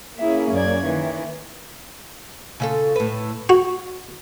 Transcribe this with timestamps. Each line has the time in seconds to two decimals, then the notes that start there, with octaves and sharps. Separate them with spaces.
0.18 A#3 C#4 E4 G#4 E5
0.51 F#2 D5 G#6
0.83 D#3 E3
2.60 C#3 F4 A4
2.96 A2 B4
3.49 F#4